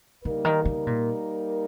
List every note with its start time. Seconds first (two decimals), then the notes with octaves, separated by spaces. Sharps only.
0.25 C#3 G3 A#3 D#4 A#4
0.45 D#3
0.65 C#3
0.87 A#2